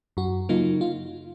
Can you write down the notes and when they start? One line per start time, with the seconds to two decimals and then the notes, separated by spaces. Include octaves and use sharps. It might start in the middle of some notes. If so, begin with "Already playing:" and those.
0.17 F#2 F#4
0.49 C#3 F#3 A#3 D#4 F4
0.81 F4